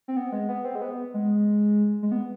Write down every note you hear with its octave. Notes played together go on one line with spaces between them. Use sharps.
C4
B3
G#3
B3
C4
G#3
B3
G#3
G#3
B3